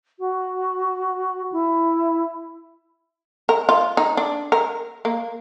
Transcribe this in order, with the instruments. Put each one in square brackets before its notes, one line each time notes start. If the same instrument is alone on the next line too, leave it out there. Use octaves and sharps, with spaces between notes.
[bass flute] F#4
E4
[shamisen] A#4
F4
D#4
D4
A#4
A#3